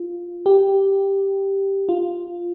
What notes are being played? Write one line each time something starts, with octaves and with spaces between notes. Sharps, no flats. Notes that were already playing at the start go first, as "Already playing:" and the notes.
Already playing: F4
G4
F4